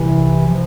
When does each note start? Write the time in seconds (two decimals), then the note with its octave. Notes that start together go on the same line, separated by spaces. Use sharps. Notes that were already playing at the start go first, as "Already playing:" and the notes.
Already playing: C2 C3 E3
0.46 C3 F3